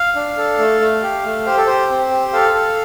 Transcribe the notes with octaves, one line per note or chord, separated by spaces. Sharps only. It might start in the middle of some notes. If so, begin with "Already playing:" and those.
Already playing: F5
D4
A4
A3
A3
G4
A3
G4 C5
A4
G4 C5
C4
G4
A4 F5
A4